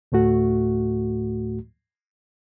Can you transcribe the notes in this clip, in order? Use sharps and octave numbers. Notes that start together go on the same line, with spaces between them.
D2 A2 A3 F#4